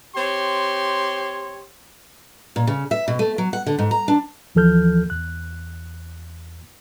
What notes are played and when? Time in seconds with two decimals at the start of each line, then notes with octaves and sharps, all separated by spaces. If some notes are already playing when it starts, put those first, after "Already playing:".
0.16 C4 G4 C#5 C6
2.56 A#2
2.67 C#3
2.91 E5
3.08 B2
3.19 A3
3.38 F#3
3.53 F#5
3.66 D3
3.79 G#2
3.91 A#5
4.08 D4
4.55 D#2 E3 F3 A4 F6 G6
5.10 E2 F#6